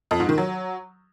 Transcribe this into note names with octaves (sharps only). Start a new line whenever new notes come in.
F2
G#2
D#3
F#3